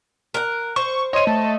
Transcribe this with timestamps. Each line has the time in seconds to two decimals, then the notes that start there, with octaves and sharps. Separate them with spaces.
0.34 A#4 F#5
0.76 C5 C#6
1.13 C#5 D#5 C6 D#7
1.27 A3 A5